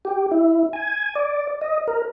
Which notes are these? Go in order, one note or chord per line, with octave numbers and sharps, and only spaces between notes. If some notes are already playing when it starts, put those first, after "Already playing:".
G4
E4
G#5
D5
D#5
A#4